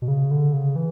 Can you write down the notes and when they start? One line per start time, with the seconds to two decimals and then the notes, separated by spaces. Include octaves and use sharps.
0.02 B2
0.08 C#3
0.31 D3
0.53 C#3
0.76 E3